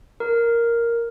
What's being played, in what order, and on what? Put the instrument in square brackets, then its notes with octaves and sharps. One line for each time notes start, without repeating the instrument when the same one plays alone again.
[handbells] A#4